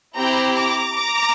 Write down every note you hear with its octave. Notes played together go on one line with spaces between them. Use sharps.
C4 E4 G4 G5 A#5
A#5 D6
A#5 D6